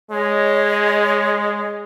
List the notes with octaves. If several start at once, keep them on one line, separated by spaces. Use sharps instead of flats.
G#3 C#5 D#5